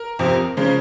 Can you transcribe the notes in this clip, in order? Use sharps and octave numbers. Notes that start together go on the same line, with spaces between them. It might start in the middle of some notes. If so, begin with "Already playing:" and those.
Already playing: A#4
F2 C3 F3
C#3 F3 G#3